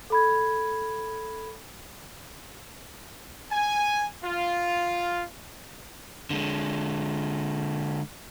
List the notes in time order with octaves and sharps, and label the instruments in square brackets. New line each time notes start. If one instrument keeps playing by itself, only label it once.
[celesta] A4 B5 G#6
[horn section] G#5
F4
[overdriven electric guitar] D3 G#3